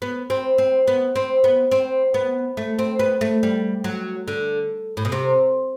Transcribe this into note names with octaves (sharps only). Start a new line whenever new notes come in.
B3
C4
C4
B3
C4
B3
C4
B3
A3
C4
B3
A3
G3
F#3
D3
A2
B2
C3